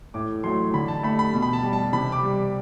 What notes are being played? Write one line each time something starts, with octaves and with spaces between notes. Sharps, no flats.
A2 D6
F#3 A3 C6
D3 B5
A5
A3 B5
B5
B2
B5
A5
G3
A5
C3 B5
D6
G3